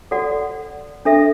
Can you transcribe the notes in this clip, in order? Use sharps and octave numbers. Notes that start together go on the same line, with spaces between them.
F#4 A4 D5 F#5
D4 A4 E5